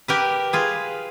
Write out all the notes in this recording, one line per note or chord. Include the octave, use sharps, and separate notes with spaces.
G4 A#4 B4
F4 G#4 B4